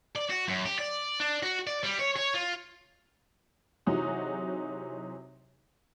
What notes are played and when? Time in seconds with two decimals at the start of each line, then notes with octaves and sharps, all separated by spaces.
0.16 D5
0.30 F#4
0.48 F#2
0.65 G4
0.79 D5
1.20 D4
1.43 F#4
1.67 D5
1.84 G3
2.00 C#5
2.17 C#5
2.35 F4
3.86 C3 E3 F#3 D#4 F#4 G#4